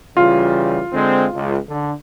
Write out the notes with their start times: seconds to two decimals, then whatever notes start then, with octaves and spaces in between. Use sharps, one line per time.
0.17 C#3 E3 G3 F4
0.92 D3 G#3 C4
1.33 C#2
1.69 D3